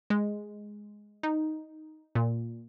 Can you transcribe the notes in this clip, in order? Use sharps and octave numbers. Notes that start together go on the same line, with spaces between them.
G#3
D#4
A#2